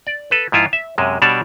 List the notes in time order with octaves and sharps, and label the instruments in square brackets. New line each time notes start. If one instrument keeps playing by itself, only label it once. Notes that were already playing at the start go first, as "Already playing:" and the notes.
[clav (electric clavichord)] D5
A4 B4
G#2 F3 E4 F4
E5
F#2 C3 G#3
B2 G3 D4 C#5 D5 A5